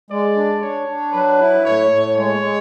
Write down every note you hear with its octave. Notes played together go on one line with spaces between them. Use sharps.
G#3 D5
D4
D4 C#5
D4
F#3 B4
E4
A2 C#5
A2
G#3 C#5
G#3